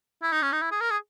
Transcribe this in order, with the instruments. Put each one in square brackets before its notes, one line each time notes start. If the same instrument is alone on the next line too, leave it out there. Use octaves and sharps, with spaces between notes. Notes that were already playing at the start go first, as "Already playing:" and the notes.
[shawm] E4
D#4
C#4
D#4
E4
G#4
A#4
G#4